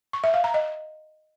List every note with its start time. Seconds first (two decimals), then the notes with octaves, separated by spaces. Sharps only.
0.13 C#6
0.24 E5
0.34 F5
0.44 A#5
0.54 D#5